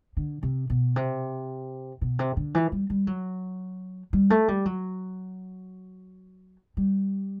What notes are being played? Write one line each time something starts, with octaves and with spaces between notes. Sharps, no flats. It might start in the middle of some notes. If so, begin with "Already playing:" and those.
D3
C3
B2
C3
B2
C3
D3
E3
G3
G3
F#3
G3
A3
G3
F#3
G3